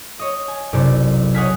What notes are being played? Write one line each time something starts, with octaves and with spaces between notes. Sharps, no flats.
C#5 D#5
G#5
F#1 B1 C3 A4 D5 A6
C#5 D#5 F#5 G#5 F6 B6